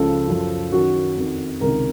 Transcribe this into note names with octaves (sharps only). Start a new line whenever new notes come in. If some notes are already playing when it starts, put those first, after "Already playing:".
Already playing: C#2 C#3 F3 A4
F#2 F3
F#2 D#3 F#4
F2 D#3
C#2 C3 D#3 A#4